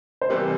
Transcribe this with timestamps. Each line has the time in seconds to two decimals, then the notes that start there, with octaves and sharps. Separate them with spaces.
0.22 C5
0.30 E2 C3 E3 G3 G4 A#4